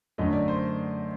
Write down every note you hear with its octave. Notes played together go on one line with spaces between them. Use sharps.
F#2 D3 F#3 A3 D#5
D5
C5